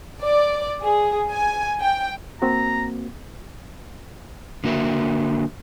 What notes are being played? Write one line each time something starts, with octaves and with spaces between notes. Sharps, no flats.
D5
G#4
G#5
G5
A#3 C4 F#4 A#5
D3 A#3 F#4 A#4 E5